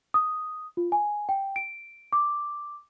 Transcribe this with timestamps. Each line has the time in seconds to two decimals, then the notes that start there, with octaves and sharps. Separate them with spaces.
0.14 D#6
0.77 F4
0.92 G#5
1.29 G5
1.56 D7
2.13 D6